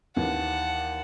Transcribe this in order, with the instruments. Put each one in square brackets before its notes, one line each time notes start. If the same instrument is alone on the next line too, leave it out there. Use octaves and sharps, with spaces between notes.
[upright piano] D#2 E3 [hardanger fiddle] F#5 A5